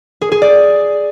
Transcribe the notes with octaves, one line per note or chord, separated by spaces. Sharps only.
G#4
G#4
D5